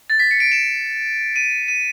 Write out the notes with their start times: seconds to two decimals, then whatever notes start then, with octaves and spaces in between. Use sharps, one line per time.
0.10 A6
0.19 B6
0.31 C#7
0.40 D7
0.52 E7
1.36 D#7
1.68 D#7